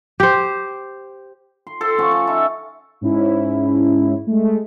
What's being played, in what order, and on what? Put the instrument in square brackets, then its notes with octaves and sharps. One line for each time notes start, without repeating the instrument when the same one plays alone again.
[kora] G4 C5
[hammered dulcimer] C6
A4 C5 C6
F3 C#4 F#5 C#6
C#5 A5
D#4 F4 E5
[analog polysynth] G#2 C#4 E4
G#3 A3